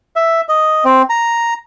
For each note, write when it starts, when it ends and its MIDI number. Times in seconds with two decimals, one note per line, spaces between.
0.16 0.41 76
0.49 0.84 75
0.85 1.02 60
1.10 1.54 82